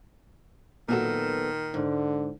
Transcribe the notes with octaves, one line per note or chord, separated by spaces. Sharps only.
A#2 D#3 F#3 B3 F#4 A4
G#2 D3